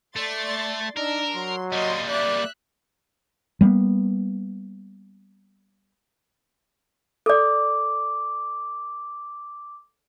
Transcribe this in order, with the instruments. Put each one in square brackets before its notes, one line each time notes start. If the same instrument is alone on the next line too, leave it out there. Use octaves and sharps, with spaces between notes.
[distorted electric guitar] A3 [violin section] D5 C6 A6
[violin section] D4 E6 [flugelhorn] D#4 [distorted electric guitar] A#4
[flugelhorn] F#3 [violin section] C6
[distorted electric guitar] G3 A#3 [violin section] D#5 C6
[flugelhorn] D5 [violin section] E5 F#6
[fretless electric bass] G3 A#3 B3
[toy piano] A4 D5 [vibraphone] D6